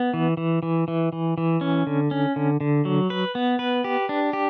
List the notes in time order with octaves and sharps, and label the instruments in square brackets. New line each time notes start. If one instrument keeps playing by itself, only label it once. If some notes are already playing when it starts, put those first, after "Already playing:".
Already playing: [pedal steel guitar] B3
E3
E3
E3
E3
E3
E3
C#4
D3
C#4
D3
D3
F#3
B4
B3
B4
G4
D4
G4